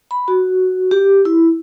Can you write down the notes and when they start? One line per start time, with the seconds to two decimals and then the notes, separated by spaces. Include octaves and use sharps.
0.11 B5
0.28 F#4
0.91 G4
1.25 E4